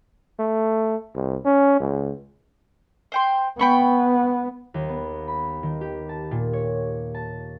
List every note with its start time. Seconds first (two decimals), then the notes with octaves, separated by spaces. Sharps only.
0.39 A3
1.15 C2
1.45 C#4
1.80 C#2
3.12 C5 G5 C6
3.59 B3 G5 B5 C#6
4.74 D#2
4.89 B3
5.28 B5
5.63 D#3
5.81 G4
6.09 A5
6.31 A#2
6.53 C#5
7.15 A5